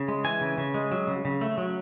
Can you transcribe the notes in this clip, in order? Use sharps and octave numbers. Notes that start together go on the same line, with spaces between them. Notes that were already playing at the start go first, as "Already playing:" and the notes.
Already playing: C#3
G#3
E3 G#5
C#3
C#3
G#3
F#3
C#3
C#3
A3
F#3